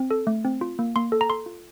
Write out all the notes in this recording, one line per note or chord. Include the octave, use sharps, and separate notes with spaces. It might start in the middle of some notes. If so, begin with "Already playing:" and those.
Already playing: C4
A4
A3
C4
F4
A#3
A#3 C6
A4
A#5
A4 C6
F4